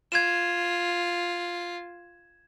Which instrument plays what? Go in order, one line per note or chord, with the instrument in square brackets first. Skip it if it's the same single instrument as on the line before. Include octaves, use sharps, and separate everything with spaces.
[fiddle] F4 [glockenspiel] G#6 E7